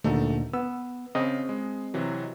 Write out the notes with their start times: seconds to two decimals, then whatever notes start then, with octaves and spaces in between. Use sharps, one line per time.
0.04 D2 A#2 D3 A3 D#4 A4
0.53 B3 E6
1.15 C#3 C4 D#5
1.49 G#3
1.94 C3 E3 F#3